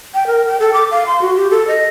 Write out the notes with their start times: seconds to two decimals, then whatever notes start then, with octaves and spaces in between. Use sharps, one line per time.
0.14 G5
0.27 A#4
0.47 G5
0.60 A4
0.74 D6
0.91 F5
1.07 C6
1.22 F#4
1.36 G4
1.51 A4
1.68 D#5